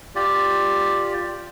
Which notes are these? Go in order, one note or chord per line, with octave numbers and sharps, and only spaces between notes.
F4 G4 D5